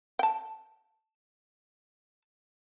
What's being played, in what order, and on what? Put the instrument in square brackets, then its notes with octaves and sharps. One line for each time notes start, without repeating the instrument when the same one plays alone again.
[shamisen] G5 A5